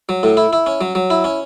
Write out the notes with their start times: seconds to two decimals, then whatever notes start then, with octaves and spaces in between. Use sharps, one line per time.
0.09 F#3
0.23 A2
0.37 E4
0.53 E4
0.66 C#4
0.81 F#3
0.95 F#3
1.10 E4
1.24 C#4